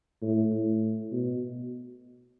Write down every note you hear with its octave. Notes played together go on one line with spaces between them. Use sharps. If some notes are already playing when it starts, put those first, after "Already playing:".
A2
A2
B2